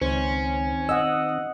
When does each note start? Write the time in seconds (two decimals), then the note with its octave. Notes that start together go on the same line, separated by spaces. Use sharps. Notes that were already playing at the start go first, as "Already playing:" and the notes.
0.02 C#2 D#3 C4 C#4 C5
0.89 D#5 F#5 E6